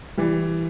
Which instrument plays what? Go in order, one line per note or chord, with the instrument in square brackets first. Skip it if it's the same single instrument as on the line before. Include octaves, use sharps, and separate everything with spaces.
[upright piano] E3 G3